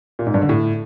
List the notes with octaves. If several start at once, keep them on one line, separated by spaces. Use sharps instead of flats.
A#2
G#2
G2
D3
A2